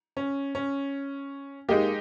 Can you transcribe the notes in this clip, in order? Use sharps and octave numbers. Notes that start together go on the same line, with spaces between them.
C#4
C#4
G#3 A#3 D#4 G4